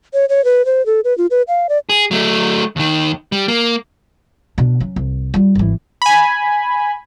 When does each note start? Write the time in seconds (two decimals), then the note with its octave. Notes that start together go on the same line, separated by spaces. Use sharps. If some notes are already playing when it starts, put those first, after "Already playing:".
0.14 C#5
0.29 C#5
0.45 B4
0.65 C5
0.86 A4
1.04 B4
1.18 F4
1.31 B4
1.48 F5
1.69 D5
1.89 G#4
2.11 F#3 A3
2.76 D#2 D#3
3.32 G3
3.48 A#3
4.58 B2 D4
4.80 F#3 C#4
4.96 C2
5.34 G3 F4
5.55 G#1 E3
6.02 G#5 B5